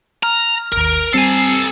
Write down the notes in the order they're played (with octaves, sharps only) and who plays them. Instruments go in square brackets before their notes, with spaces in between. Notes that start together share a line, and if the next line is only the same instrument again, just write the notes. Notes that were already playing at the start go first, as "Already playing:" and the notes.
[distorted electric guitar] A#5 [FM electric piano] F6
[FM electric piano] G#1 D#2 [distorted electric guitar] A#4
[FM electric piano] G3 C4 C7 [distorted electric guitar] A4 G#5